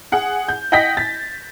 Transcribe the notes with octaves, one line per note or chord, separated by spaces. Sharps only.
G#4 F#5
G6
D#5 F#5 G5 G6 A#6 B6
A6